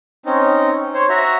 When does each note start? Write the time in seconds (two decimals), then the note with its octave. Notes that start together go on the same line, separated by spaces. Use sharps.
0.26 C4 C#4 D#4
0.94 C5 C#5
1.09 F#4 E5 A#5